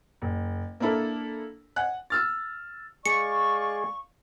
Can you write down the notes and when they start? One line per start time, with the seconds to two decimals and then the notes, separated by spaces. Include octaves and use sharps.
0.22 F#1
0.80 A#3 D4 E4 A4 A#4
1.76 F#5 G#5 F#6
2.10 E6 F6 A6
3.06 G#3 G#4 D5 F5 C#6 C#7